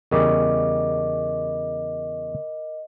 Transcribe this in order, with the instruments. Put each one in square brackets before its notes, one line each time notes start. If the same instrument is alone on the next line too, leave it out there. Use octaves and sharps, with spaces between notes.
[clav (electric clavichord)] E2 C#3 G3 [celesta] A#4 D6 [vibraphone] D#5